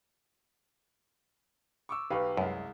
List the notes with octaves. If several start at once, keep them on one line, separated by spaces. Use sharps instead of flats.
C#6 D6 E6
B1 G4 B4 F5 C#6
C2 F#2 G#3